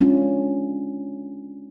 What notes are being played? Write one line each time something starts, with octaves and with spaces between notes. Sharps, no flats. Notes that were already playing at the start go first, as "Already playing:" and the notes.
G#3 C#4 D4 F4